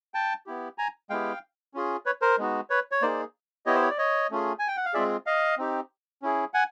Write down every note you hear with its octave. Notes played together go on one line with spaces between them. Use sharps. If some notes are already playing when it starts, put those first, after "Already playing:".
G5 A5
B3 E4 G4
G#5 A#5
G#3 B3 E4 G4 F5 G5
C#4 F4 G#4
B4 C#5
A#4 C5
G#3 B3 D#4 F#4
B4 C#5
C#5
A#3 D#4 G#4 C5 D5
B3 E4 G4 C#5 D#5
C5
C#5
D5
C#5 D#5
A3 C#4 F4 G#4
G#5
G5
F#5
F5
G#3 C4 F4 G#4 D5 E5
D#5 F5
C4 D#4 G4
C#4 E4 G#4
F#5 G#5